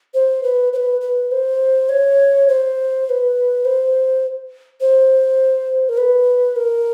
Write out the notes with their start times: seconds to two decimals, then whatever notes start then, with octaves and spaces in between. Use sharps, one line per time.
0.14 C5
0.43 B4
0.73 C5
0.76 B4
1.01 B4
1.31 C5
1.89 C#5
2.48 C5
3.06 C5
3.10 B4
3.65 C5
4.81 C5
5.89 A#4
5.98 B4
6.56 A#4